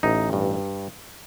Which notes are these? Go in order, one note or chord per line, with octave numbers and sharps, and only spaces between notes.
A1 D#4
G2